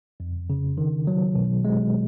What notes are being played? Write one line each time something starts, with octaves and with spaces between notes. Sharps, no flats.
F2
C#3
D#3
F#3
B2
G#3